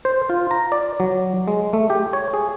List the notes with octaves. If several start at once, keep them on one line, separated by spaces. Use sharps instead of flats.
C5
F4
A#5
D5
F#3
G#3
A3
G4
C#5
G#4